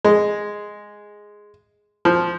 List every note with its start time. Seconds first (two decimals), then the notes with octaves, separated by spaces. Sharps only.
0.05 G#3
2.05 F3